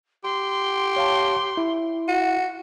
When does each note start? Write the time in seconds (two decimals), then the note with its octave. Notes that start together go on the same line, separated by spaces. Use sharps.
0.24 G4 C6
0.96 C#5 F5 A5
1.57 E4
2.08 F#4